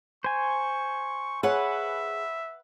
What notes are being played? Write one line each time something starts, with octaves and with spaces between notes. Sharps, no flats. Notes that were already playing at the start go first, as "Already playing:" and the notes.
C5 G#5 C#6
G#4 B4 C#5 E5 F#5